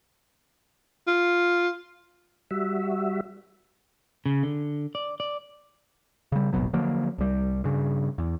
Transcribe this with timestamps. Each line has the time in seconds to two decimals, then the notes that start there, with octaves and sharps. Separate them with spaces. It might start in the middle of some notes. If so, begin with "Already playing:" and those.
1.07 F4
2.51 G3 F#4 E5
4.26 C#3
4.43 D3
4.95 D5
5.20 D5
6.32 C#3 G3
6.53 D#1 G#1 B2 F#3
6.73 D3 F3 F#3 A#3
7.18 C2 G3
7.64 G2 C#3
8.18 E2